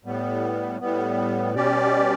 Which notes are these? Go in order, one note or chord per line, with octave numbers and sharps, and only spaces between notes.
A2 G3 B3
A2 G3 B3
B2 G3 C#4 G4 D5